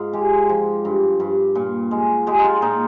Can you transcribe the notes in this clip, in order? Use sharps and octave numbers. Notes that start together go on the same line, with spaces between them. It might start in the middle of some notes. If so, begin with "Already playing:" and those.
Already playing: G#2 F4
G#3 G4
F3
G2
G2
A#2
G#3
G#3 G4
D#4
F4
A#2 D#4